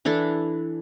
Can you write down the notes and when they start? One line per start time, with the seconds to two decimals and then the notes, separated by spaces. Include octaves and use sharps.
0.05 E3 D4 E4 A4